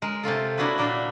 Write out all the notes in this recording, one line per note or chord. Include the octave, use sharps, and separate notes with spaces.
G#3 A#4
C3 A3 F4 A4
A#3 D4 E4 F#4 G#4 B4
A#2 A#3 D4 D5 E5